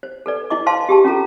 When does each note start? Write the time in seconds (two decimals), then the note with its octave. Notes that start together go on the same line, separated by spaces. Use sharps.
0.03 C5
0.26 A4 B4 D5
0.50 E4 D#5 D6
0.66 B4 C5 F5 A5 C6
0.89 G4 G#4 A5
1.04 C#4 F4 A4 A#5